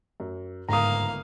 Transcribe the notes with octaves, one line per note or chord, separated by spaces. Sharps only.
F#2
G1 C#2 G#2 A#3 F5 A#5 D#6